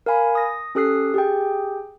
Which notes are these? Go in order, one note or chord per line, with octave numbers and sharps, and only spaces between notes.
A#4 F5 G#5 B5
D#6 A#6
C#4 G4 A4 D#6 F#6 C7
G4 G#4 G5